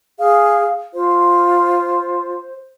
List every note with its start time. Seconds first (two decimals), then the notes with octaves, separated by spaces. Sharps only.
0.19 G#4 F5
0.94 F4 C5